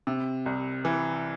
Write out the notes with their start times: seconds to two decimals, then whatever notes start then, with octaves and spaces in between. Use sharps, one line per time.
0.07 C3
0.46 C2
0.85 E3